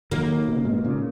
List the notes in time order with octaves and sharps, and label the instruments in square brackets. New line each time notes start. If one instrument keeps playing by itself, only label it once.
[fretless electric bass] D#3 F#3 [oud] A#3
[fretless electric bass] B2
C#3
G#2 B2
B2
A#2 C#3